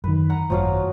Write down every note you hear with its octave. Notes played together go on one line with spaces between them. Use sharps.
F#2 D#3 B4
F#5 A#5
G#1 F#2 A2 F3 F#3 F5